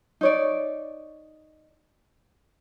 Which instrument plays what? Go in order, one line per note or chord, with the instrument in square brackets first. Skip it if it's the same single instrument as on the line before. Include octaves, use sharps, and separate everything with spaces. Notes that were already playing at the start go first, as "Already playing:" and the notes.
[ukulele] D#4 C#5 D5